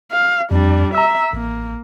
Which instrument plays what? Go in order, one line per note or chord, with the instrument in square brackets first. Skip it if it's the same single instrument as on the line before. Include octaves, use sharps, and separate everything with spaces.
[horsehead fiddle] F5
[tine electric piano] F2 [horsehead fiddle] G3 D4
[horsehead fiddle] E5 [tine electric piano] A#5 E6
[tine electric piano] A1 [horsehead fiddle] A#3